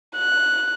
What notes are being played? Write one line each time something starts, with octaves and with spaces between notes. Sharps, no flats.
F#6